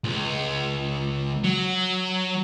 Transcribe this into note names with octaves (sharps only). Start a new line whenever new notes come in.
C#2
F#3